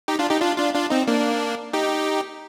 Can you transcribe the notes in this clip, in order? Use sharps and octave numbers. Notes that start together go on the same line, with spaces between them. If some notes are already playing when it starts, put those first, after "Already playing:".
D#4 G4
D4 F4
D#4 G4
D4 F4
D4 F4
D4 F4
C4 D#4
A#3 D4
D#4 G4